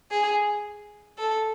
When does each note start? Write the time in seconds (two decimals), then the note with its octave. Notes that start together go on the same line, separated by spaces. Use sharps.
0.11 G#4
1.18 A4